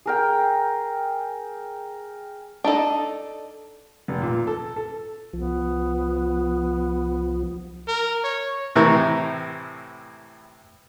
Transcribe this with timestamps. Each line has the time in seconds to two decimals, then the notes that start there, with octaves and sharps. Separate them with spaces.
0.06 G#4 A#4 G5
2.64 D4 D#4 A4 D#5
4.08 F1
4.22 A#2
4.47 A4
4.76 A4
5.33 C2 F3 B3
7.88 A#4
8.24 C#5
8.76 A2 C3 E3 A#5 C#6